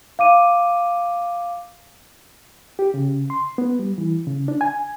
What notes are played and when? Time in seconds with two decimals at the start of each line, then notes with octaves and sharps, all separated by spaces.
0.19 F5 D6 D#7
2.79 G4
2.94 C#3
3.30 C6
3.58 B3
3.79 G3
3.98 E3
4.27 C#3
4.48 D4
4.61 G#5